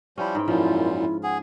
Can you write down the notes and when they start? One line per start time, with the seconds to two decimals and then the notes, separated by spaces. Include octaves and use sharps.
0.18 F3 G3 C#4 E4
0.35 G#2 B4 G5
0.48 F#2 A#2 F3 E4
0.97 E4
1.23 G#4 F#5